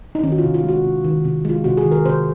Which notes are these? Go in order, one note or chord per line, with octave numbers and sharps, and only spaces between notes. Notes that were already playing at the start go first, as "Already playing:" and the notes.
D#4
D#3 C#4
F#4
F4
C3
F4
G#3 F#4
C3
D#3
C3
G#3 F4
C3 F#4
G#4
D#3
A#4
C3 C5